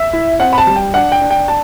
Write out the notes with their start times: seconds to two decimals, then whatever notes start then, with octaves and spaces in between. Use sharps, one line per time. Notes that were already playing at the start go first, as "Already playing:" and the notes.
Already playing: E5
0.13 E4
0.40 C4 F#5
0.53 B5
0.58 A5
0.67 G3
0.76 G5
0.94 D4 F#5
1.12 G5
1.21 D4
1.31 G5
1.48 A5